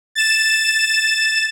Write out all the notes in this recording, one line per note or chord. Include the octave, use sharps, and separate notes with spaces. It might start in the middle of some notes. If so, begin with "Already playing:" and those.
A6 E7